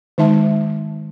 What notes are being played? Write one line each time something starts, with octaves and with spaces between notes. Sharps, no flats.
D#3 G#3 D#4 E5 A5